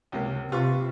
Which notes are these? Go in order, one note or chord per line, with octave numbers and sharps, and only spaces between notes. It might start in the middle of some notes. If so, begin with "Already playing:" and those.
C#2 C3 A#3
C3 F4 G4 B4 C#6